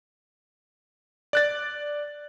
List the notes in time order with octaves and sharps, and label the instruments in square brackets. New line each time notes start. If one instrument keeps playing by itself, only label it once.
[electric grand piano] D5 F#6 A6